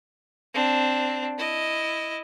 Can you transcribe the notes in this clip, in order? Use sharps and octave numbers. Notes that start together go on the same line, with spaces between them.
C4 D4
E4 D#5